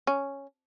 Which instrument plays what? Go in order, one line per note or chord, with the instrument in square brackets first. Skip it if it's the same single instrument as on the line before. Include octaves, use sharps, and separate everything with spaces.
[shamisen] C#4